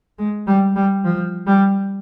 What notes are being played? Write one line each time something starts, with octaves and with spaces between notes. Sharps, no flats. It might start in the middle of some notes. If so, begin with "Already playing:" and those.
G#3
G3
G3
F3
G3